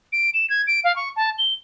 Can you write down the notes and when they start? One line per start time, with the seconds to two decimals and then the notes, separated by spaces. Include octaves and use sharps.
0.12 D7
0.34 E7
0.50 G#6
0.67 D7
0.84 F5
0.96 C#6
1.16 A5
1.38 G7